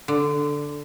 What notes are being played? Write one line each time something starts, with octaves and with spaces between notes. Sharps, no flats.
D3